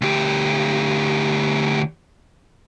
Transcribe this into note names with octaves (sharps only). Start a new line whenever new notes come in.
D2 G4